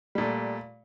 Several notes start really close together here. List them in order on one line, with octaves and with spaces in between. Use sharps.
G3 A#2 A3